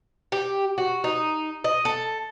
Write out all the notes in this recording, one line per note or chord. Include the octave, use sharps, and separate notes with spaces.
G4
F#4
D#4
D#5
A4